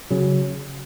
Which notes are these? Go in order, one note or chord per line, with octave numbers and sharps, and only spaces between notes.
C#3 F#3 C#4